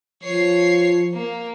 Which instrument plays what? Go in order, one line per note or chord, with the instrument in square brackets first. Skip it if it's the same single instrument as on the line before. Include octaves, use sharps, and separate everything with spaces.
[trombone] F3 [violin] C#5 C7
[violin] A#3